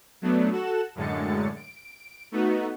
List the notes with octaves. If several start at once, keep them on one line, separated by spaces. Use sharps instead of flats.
F#3 A3 B3 D4
F#4 A4 F#6 E7
F#2 A2 D3 G#3 A6 C#7
D7
A3 B3 D#4 F#4